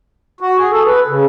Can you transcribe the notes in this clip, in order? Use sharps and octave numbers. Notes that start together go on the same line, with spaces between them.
F#4
G#4
A4
B4
C#3